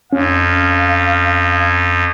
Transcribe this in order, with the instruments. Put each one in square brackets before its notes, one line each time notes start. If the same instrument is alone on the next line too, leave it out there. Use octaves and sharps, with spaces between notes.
[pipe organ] F2 [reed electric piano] C#4 [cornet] F5